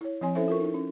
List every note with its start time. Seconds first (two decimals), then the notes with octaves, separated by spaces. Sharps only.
0.01 E4 C#5
0.21 F3 C4 C#5 G#5 C6
0.35 C#4 E4 A4 C5 E5
0.48 F4 A4 A#4 C#6
0.60 D#4 E4
0.74 C#4